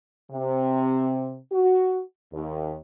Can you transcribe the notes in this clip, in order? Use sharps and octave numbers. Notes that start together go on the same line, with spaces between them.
C3
F#4
D#2